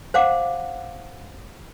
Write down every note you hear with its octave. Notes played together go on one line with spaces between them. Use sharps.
C5 F5 F#5 D6